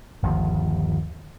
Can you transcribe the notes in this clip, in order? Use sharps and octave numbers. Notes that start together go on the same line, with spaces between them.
G1 D#2 F3